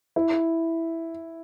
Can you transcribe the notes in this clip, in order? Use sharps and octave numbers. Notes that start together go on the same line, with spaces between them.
E4